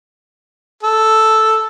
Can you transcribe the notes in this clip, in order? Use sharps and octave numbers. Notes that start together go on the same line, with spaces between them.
A4